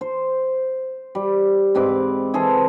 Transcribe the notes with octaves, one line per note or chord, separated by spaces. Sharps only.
C5
G3
G#2 C4 B4 D6
E3 G#4 A4 C5